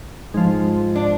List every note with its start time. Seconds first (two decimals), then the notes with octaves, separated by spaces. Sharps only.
0.34 G#2 F3
0.96 D4